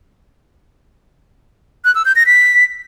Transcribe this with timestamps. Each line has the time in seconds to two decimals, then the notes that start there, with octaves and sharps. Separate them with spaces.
1.85 F#6
1.95 E6
2.05 G6
2.16 A#6
2.26 B6